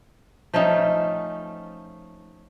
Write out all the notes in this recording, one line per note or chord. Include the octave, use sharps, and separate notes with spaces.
F3 A3 C#4 D#4